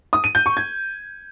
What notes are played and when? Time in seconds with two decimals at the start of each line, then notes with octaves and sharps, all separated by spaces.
0.13 D#6
0.24 D#7
0.35 G6
0.46 C#6
0.57 G#6